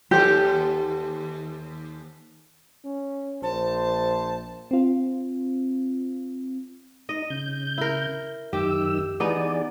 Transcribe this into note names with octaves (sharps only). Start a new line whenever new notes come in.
D#2 G4 A4 C5
C#4
A#1 C5 A5
C4 F4
D#4 D#5
C#3 G6
E4 A#4
F#2 D#3 G4 E6
E3 B3 D#4 G#4 D5